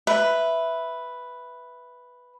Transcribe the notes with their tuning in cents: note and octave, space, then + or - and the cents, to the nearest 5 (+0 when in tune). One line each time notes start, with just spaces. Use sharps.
B4 +0 E5 +0